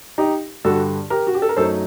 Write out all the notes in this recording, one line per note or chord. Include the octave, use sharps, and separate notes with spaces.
D#4 G4
G2 D3 G3 F#4 A4
G4 A#4
F#4
G4
A4
A#4
F#2 F#3 A3 D#4 A4 C5